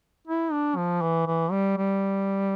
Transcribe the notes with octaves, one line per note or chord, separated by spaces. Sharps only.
E4
D4
F3
E3
E3
G3
G3